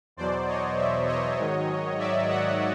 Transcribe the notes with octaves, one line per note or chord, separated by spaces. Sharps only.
E2 B2 F#3 C5 D5
C#5 D#5
D5 E5
C#5 D#5
G#2 D#3 F#3
D5 E5
E5 F#5